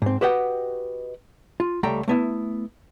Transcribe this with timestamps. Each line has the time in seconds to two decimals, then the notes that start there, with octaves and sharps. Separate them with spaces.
0.02 G#2 C4
0.21 F#4 G4 B4 D#5 F#5 G5
1.60 F4
1.83 C#2 G3 A3 G5 A#5
2.08 A3 B3 E4